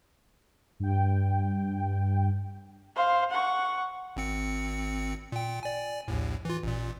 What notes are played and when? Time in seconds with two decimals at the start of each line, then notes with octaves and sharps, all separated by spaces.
0.80 G2 G5
2.96 C5 F5
3.31 F#5 C#6
4.16 G#1 C4 C#7
5.32 A#2 G5
5.63 D5 G#5
6.08 A#1 D#2 A2
6.45 E3 F4
6.63 A1 A#2